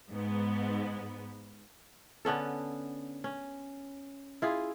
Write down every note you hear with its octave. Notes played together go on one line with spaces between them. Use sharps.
G#2 B3
D3 B3 C#4 A4
C#4
E4 F4 G#4